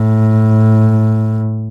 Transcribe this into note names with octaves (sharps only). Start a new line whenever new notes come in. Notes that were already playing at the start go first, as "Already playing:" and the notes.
Already playing: A2